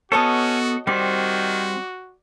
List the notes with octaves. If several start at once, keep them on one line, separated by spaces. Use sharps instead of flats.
B3 C#4 F#4 A4 C#5 D#5 A5
D#3 G3 C4 F#4 D5